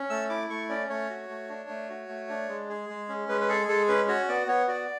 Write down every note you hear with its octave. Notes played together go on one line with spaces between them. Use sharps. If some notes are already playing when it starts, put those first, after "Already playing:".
Already playing: C#4
A3 E6
E4 D6
A3 C#6
C#4 D5
A3 C#5
F#4
A3
D4
A3
F#4
A3
D4
G#3
G#4
G#3
C#4
G#3 B4
B4
G#4 A4
G#3 A4
C#4 B4
F#4 C#5
B3 D5
B3 C#5
F#4 D5